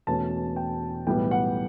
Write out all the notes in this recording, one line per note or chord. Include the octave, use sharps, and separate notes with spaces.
E1 E2 B2 A3 C#4 A5
G5
B1 A2 E3 G3 B3 G5
F#5